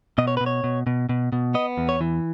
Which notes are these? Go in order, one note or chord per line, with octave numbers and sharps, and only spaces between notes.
B2 D#5
C#5
B2 B4
C#5
B2
B2
B2
B2
B3 D#5
E2
C#5
E3